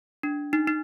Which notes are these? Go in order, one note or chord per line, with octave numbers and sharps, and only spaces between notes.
D4
D#4
D#4